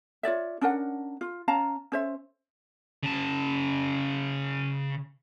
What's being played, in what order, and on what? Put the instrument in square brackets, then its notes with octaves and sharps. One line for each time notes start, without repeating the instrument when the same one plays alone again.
[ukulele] F4 C#5 D5 E5
C#4 D4 A#4 F#5
F4
C#4 F5 A5 A#5
C#4 C5 E5
[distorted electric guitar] C#3 A5